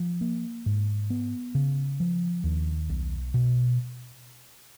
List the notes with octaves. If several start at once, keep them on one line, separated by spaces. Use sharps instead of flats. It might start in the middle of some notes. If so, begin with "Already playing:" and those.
Already playing: F3
A#3
G#2
B3
C#3
F3
D#2
B1
B2